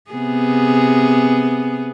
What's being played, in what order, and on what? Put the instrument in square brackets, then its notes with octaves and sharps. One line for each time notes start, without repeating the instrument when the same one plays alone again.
[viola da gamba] C3 B3 G#4